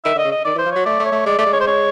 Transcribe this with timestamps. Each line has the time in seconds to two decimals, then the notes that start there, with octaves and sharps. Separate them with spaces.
0.05 D#3 E5
0.15 D3
0.18 D#5
0.24 C#3
0.32 D#5
0.45 D#3 D5
0.56 E3
0.59 C5
0.66 F3
0.71 F#3 C#5
0.85 A3 D5
1.00 A3
1.05 C#5
1.12 A3
1.26 G#3 D5
1.38 A3 D5
1.46 G#3
1.53 C#5
1.61 C5
1.67 C#5